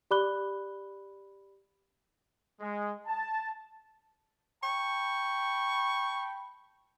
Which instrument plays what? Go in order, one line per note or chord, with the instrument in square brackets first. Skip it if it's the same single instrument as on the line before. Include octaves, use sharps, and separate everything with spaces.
[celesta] G4 D5 B5 D6 F#6 G7
[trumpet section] G#3
A5
[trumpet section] G5 A5 B5 [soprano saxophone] C#6